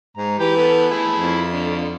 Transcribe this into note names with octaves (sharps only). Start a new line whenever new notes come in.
G#2 A#5
E3 G4
B3 A4
E4 G#4 A5
F2
D3